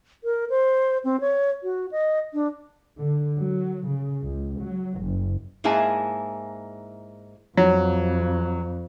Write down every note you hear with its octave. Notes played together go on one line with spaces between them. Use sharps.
A#4
C5
C4
C#5
F#4
D#5
D4
D3
F#3
C#3
C#2
F#3
F#1
G#2 A#3 E4 G#4 G#5 A5
F2 F#3